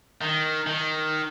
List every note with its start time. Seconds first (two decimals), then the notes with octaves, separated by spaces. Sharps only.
0.21 D#3
0.67 D#3